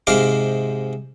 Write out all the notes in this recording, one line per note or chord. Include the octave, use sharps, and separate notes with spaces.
G#2 C3 G#3 C5 F5 D6